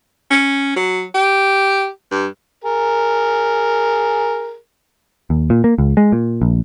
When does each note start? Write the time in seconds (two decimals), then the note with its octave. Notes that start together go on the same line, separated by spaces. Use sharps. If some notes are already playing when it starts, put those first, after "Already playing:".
0.31 C#4
0.76 F#3
1.14 G4
2.11 G2
2.64 G#4 A#4
5.30 D#2
5.50 A#2
5.64 A#3
5.78 C#2
5.97 G#3
6.12 A#2
6.42 A#1